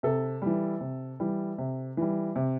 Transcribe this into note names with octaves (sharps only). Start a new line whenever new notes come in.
C3 A4
E3 G3
C3
E3 G3
C3
E3 G3
C3